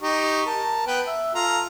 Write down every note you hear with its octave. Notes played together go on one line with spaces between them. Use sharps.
D#4 G4 C#6
A#4 A5
B3 B4 G5
E5
F4 A4 A#5